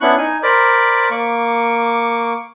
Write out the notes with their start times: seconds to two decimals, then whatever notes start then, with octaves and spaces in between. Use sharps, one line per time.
0.01 B3 C#4 D4 E4 C#6 F#6
0.18 D#4 G#5
0.43 A#4 C5 D5 B5 D6
1.10 A#3 C#6 D6